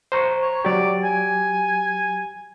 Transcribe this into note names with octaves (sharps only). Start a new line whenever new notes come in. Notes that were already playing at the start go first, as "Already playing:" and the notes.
C5 A#5 C#6
C#5
F#3 G4 D5
G#5